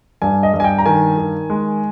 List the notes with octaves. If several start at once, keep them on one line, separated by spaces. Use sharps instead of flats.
G2 G#5
D#5
G2
G#5
G5
A#5
D#3 G#5
D#3
G#3